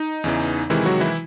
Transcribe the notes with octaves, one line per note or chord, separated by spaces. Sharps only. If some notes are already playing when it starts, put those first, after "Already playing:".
Already playing: D#4
E2 C#3 E3
C3 D#3 E3 G#3 E4
F#3 F#4
E3 E4